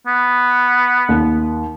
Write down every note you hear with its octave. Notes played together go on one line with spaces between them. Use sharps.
B3
D#2